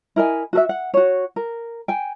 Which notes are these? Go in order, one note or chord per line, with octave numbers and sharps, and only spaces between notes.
E4 A#4 D#5 G#5
F#4 A4 E5
F#5
F#4 C#5
A#4
G5 G#5